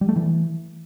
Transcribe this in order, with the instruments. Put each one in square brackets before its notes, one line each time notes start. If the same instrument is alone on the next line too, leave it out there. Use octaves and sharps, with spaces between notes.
[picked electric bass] G3
A3
E3